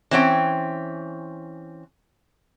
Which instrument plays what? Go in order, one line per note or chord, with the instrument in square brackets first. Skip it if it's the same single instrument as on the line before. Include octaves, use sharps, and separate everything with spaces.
[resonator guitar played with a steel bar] E3 C4 C#4 G5